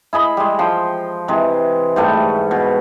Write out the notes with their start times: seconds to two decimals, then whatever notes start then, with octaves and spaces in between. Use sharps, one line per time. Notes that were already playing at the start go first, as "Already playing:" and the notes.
0.13 E4 G#4 D#5 B5
0.37 G3 G#3
0.59 F3 G5 C6
1.28 C3 E3 G#3
1.96 G#2 G3 A3 B4
2.51 B2